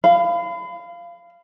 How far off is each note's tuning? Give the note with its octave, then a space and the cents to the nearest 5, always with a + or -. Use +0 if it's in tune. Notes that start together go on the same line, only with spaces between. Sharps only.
F5 -15 B5 +30